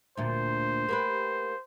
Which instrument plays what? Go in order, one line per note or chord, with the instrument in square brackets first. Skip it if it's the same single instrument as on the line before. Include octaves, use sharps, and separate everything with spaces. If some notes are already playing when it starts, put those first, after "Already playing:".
[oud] D2 A#2 [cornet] C5
[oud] A#3 G4 B4